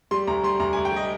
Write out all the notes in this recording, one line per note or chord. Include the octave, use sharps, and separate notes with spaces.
G3 C6
D2 A#5
G3 C6
D2 A#5
G#5
D2
G5
G3 D#5